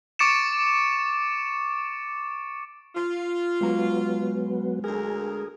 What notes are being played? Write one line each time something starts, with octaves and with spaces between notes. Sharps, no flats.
C#6 D6 A6 C#7 D7 E7
F4
F#3 G#3 B3 F5 A#5
D2 G#4 A#4